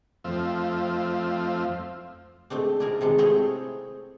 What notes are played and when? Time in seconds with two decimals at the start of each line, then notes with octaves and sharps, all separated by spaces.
0.24 F2 F3 A3 C4 F5 E6
2.50 G#3 A3 C4 D4
2.80 D4 E4 G#4 A#4
3.01 C3 D#3 G#3 D4
3.18 A3 C4 E4 G#4 C#5 D#5